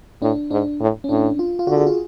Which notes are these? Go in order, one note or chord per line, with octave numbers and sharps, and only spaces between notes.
A2 D4
G#2 D4
A2
C#4
A2 D4
F4
F4
D3 F#4
G#4
F4